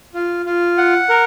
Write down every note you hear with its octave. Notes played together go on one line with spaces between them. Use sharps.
F4
F4
F#5
A#4